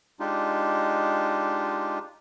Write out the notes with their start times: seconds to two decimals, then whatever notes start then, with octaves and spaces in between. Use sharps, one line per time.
0.20 G#3 D4 D#4 F4 G4